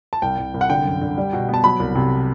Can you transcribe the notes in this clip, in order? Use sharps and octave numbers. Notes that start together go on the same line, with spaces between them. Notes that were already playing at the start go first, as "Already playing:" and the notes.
A5
C2 G5
C2
C2
F#5
D3 G5
F#2
D3
G3
B2
B3 A5
F#3 B5
C2
C3